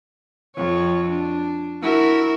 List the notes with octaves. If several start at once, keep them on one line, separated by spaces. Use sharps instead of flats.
F2 C#5
D4
E4 F#4 A#4